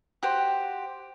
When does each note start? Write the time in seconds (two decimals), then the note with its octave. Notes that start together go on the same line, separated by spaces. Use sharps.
0.23 F#4 G4 C5